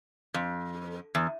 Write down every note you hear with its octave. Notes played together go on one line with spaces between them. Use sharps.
F2
E2